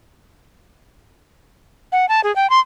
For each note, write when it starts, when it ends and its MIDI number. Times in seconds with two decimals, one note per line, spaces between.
1.92 2.08 78
2.09 2.21 81
2.24 2.34 68
2.36 2.50 79
2.50 2.60 84